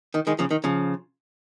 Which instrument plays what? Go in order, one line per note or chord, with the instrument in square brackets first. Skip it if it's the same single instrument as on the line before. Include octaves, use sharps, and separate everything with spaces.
[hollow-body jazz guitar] D#3
D#3 G#3
C#3 F3
D#3
C#3 F3